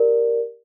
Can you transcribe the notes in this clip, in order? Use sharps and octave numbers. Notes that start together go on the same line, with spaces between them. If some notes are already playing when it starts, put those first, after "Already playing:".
Already playing: G4 A#4 D5